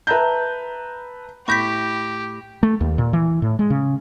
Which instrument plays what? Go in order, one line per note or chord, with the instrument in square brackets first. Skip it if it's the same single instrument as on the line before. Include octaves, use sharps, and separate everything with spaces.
[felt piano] B4 E5 A5 A#5 G6
[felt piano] A2 B5 A#6 [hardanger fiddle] G4 [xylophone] C#6 G6 B6
[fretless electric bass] A3
D#2
A#2
E3
A2
G#3
C#3